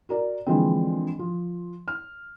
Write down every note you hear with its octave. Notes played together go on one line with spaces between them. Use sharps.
F#4 A#4 D5
D3 E3 F3 G#3 A#3 C4
F3
F6